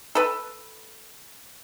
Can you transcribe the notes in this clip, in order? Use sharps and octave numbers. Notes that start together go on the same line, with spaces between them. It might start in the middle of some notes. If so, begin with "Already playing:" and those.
A4 B4